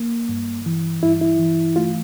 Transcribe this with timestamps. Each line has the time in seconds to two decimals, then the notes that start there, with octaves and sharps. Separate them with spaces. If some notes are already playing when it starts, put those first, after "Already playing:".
Already playing: A#3
0.29 G2
0.66 E3
1.03 G2 E4
1.21 E4
1.39 E3
1.76 A3 F4